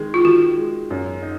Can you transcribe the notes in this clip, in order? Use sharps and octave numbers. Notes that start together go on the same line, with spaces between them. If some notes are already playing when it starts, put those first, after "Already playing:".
Already playing: D#3 G#3
F4
D#3 F#4
G#3
F#2
D#4